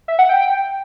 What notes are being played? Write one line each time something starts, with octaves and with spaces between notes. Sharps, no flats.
E5
F#5
G5